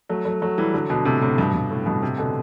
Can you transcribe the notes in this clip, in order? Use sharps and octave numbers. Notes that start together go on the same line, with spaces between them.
F#3 A3
F#3 A3
F#3 A3
E3 G3
D3 F#3
B2 D3
A2 C3
A2 C3
G2 B2
G2
A2
G2 B2
A2 C3
B2 D3